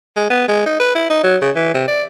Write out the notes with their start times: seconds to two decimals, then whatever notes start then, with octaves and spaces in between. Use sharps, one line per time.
0.16 G#3
0.30 B3
0.48 G#3
0.66 D#4
0.80 B4
0.95 E4
1.10 D#4
1.24 F#3
1.42 C#3
1.55 E3
1.74 C3
1.88 D5